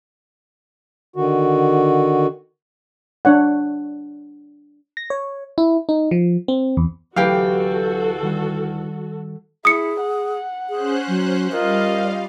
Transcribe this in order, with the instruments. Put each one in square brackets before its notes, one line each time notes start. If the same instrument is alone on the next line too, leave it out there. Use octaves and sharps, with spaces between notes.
[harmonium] D3 D#3 F#4
[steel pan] D4 C#5 F#5
[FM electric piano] A#6
C#5
E4
D#4
F3
C4
E2
[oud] D2 E3 G4 [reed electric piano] F#3 [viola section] F#4 A4 [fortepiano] F5 G5
[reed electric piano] D#3 G3
[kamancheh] E4 [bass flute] G#4 [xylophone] D#6 C#7
[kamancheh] F#5
[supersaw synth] C#4 C5 F#6 [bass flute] G#4
[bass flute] F#3
[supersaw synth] G3 F5 [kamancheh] F4 D#5 [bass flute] A#4